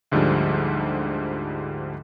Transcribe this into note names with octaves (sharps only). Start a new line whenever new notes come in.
D2 G#2 D3 F3 G3